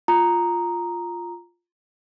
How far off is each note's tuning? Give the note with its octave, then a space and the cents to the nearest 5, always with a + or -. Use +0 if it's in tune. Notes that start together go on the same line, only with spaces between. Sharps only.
F4 +0 A#5 +0 D#6 +0